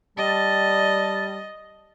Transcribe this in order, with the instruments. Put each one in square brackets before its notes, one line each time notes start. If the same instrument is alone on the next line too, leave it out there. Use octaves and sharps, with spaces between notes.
[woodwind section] G3 A5 [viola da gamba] D#5